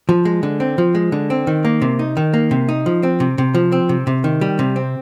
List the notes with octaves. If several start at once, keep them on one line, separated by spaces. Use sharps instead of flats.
F3
G#3
D3
C4
F3
G#3
D3
C4
D#3
A#3
C3
D#4
D#3
A#3
C3
D#4
F3
C4
C3
C3
F3
C4
C3
C3
D#3
G3
C3
C4